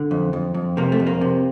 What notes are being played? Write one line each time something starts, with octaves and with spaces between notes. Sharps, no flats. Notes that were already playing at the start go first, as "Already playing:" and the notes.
Already playing: D3
F2
F2
F2
C3 A#3
A3
F2
A#3
C3